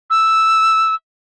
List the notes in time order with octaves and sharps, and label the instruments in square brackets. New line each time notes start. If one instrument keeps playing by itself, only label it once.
[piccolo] E6